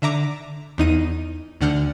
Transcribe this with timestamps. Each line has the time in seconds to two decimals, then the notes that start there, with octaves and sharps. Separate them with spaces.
0.02 D3 E5 A#5 D6
0.78 E2 D#4 D#7
1.61 D2 D3 F#5 F6 G6